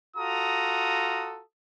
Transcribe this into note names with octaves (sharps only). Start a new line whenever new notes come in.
F4 F#4 A4 A#5 D#6